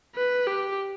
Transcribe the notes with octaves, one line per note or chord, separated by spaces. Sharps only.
B4
G4